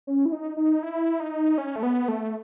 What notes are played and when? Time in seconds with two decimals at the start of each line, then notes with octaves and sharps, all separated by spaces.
0.07 C#4
0.26 E4
0.32 D#4
0.57 D#4
0.83 E4
1.20 D#4
1.58 C#4
1.76 A3
1.83 B3
2.08 A3